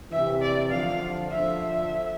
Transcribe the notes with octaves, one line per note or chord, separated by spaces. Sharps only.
C3 E3 E5
D5
D3 F3 F5
D3 F3 E5